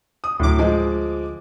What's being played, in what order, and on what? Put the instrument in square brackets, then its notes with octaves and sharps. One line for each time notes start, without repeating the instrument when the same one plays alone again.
[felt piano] D#6
[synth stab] D2 D6 [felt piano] A2 F#3
[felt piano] F3 G#3